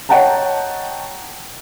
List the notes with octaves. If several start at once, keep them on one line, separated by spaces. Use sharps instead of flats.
C#5 D#5 F#5 G5 A5 A#5